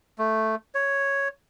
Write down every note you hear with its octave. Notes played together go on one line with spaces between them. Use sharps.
A3
C#5